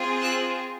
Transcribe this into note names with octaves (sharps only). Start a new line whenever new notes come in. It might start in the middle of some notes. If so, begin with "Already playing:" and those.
Already playing: C4 F4 G#4
E6 F#6